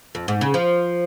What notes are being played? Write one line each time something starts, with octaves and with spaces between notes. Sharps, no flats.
F2
G#2
C#3
F3